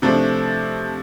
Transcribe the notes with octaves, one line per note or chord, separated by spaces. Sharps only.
C3 F3 A3 D4